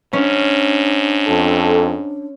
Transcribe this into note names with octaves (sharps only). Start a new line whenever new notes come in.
G#2 C#4 D4
F2 A4